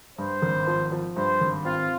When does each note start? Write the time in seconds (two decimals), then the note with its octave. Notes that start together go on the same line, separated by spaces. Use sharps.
0.18 G2 C5
0.42 G#1
0.67 F3
0.92 F3
1.16 G2 C5
1.41 G#1
1.65 C4 F4